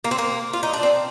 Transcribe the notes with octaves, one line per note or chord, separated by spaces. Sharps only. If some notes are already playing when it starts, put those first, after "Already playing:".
A#3
C4
A#3
F4
D#4
D4
C4